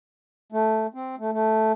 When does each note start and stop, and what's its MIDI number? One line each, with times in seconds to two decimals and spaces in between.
0.52 0.87 57
0.94 1.15 60
1.19 1.31 57
1.32 1.72 57